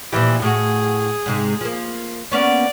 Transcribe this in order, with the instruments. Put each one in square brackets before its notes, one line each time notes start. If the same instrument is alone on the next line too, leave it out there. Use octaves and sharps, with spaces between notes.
[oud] A#2 F3 G4 [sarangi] E3
[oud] A2 F#4 [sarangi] G#4
[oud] G#2 C3 G#3
F3 A#3
[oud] A#3 B3 C#4 [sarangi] D5